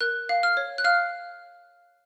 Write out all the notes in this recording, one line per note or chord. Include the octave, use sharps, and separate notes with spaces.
A#4 F#6
F5
F6
C#5
F#6
F5 F6